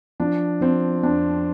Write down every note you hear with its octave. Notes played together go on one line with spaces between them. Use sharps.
F3 D4
F3 C4
F2 D4